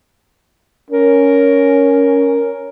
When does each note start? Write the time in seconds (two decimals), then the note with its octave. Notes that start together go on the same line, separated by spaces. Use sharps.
0.90 C#4 A#4